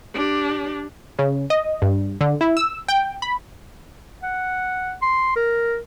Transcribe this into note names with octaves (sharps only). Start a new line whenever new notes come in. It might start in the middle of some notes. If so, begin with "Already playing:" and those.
D4 G4
C#3
D#5
G2
D3
E4
E6
G5
B5
F#5
C6
A#4